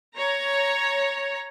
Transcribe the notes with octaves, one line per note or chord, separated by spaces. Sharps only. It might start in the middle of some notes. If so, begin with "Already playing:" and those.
C#5 A#5